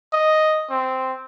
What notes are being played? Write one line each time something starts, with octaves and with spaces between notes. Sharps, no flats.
D#5
C4